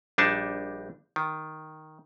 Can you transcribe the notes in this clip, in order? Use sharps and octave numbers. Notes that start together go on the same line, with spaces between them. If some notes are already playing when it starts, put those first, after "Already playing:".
A#1 G3 D4 D#4 A5
D#3